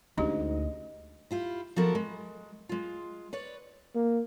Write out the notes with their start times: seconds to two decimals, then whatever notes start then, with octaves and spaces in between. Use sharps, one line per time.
0.18 D2 G#2 C#4 D4 G4 D#5
1.31 E4 F4 G4
1.76 F3 B3 E4 F#4 A4 A#4
1.95 G#3
2.69 G#3 F4
3.33 B4 C#5 D5
3.95 A#3